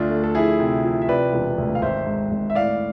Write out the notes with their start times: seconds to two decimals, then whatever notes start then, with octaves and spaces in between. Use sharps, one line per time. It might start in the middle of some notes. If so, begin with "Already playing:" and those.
Already playing: D2 A3 D4 F4
0.10 A3
0.24 A4
0.35 F3 E4 G#4
0.60 C3
0.84 F3
1.01 E5
1.09 C3 B4 D5
1.33 E1
1.58 D2
1.75 F5
1.82 G#1 C5 E5
2.06 G#2
2.31 G#1
2.50 E5
2.55 A2 D5 F5